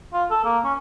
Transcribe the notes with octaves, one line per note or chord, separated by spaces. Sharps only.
F4
A4
A#3
C#4